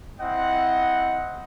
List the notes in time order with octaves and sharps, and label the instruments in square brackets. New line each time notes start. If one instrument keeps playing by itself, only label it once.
[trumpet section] C4 E4 D#5 F#5